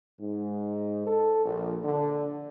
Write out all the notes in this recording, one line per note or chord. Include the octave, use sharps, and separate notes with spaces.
G#2
A4
A#1
D3